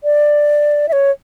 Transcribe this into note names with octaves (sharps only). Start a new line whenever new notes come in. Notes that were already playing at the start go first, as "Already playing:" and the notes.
D5
E5
C#5